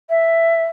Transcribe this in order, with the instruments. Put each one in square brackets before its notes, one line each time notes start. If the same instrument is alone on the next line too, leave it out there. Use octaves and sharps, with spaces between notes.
[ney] E5